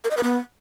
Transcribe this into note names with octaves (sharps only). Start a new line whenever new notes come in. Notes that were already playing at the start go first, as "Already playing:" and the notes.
A#4
D#5
B4
B3